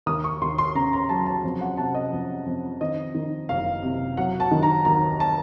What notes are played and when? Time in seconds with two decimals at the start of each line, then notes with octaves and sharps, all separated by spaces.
0.06 D#2 D#6
0.24 C#6
0.41 D#2 C6
0.58 C6
0.75 C#3 A#5
0.93 A#5
1.09 F#3 A5
1.26 A5
1.44 F2
1.61 F#5
1.77 C3 A5
1.95 D#5
2.13 F2
2.46 F2
2.81 D#3 D#5
3.15 D#3
3.49 F#1 F5
3.83 C3
4.17 F#3 F#5
4.40 A5
4.51 D#3
4.63 A#5
4.85 D#2 A#5
5.20 A5